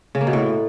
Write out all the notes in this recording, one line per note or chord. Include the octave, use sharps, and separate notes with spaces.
C#3
A#3
B2
A2